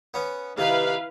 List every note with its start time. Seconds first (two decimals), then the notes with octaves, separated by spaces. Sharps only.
0.14 B3 C#4
0.58 C3 D#3 E4 B4 F5